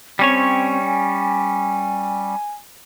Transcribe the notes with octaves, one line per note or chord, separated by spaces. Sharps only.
G3 C4 C#4 C#5
G#5